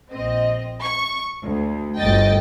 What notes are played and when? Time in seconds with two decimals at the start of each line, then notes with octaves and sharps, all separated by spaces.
0.13 A#1 C4 D#5
0.83 C#6
1.43 D2
1.99 G1 D2 D#5 G5 A6